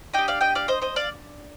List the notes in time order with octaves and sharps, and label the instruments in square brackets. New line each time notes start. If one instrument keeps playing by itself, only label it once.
[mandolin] D4 G4 D#5 G5
D5 F5
D#5 G5
D5 F5
C5 D#5
C5 D#5
D5 F5